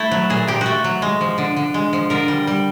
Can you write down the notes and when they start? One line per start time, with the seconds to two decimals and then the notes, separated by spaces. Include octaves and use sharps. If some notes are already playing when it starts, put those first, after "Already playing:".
Already playing: A3 E4
0.11 F#3
0.30 A#2 G#4
0.48 A#2 G4
0.61 A3 F#4
0.84 F#3
1.02 G#3
1.21 F3
1.38 D3
1.57 D3
1.74 G#3
1.93 F3
2.10 D3 A#4
2.28 G3
2.47 G3